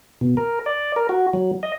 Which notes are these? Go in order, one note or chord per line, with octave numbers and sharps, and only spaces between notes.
B2
A#4
D5
A#4
F#4
F#3
D#5